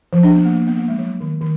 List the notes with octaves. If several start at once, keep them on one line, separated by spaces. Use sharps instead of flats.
F3
D4
B3
A#3
A#3
B3
A#3
G#3
F#3
D#3
D#3